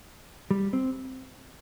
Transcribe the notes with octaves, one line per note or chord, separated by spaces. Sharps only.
G3
C4